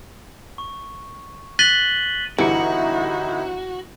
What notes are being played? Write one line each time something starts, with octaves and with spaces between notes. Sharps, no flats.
C#6
F#6 A6 B6 D#7 F#7 G7
G1 C2 E3 D#4 E4 F#4 C#7